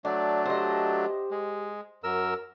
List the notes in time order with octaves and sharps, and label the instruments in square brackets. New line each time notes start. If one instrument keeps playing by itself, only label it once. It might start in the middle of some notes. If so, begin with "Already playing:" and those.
[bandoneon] F#3 A3 D4 [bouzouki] D5
[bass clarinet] G4 [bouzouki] C5 D#5
[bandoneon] G#3
F#2 A#4 E6